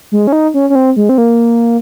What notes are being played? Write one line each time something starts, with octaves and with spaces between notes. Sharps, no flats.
G#3
C#4
D#4
C#4
C#4
C4
G#3
C4
A#3